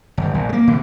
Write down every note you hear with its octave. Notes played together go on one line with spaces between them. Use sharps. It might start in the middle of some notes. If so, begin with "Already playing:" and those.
G1
A#1
G#3 A#3
B2 D3